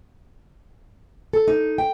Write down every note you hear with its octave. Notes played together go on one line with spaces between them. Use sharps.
A4
D#4
G5